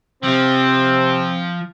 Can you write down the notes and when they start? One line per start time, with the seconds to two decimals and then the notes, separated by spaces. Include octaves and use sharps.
0.23 C3 F3 C4